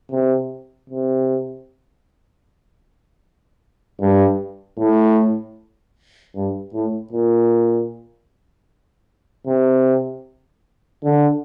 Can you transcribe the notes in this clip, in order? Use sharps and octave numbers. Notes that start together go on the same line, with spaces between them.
C3
C3
G2
A2
G2
A2
A#2
C3
D3